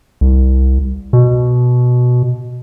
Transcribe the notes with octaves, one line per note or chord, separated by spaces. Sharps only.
C2
B2